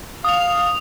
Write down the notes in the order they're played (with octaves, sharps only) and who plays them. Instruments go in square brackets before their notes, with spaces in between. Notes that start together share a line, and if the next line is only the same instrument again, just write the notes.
[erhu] F5 [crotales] D#6 F7